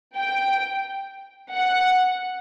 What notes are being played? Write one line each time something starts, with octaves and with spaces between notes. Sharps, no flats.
G5
F#5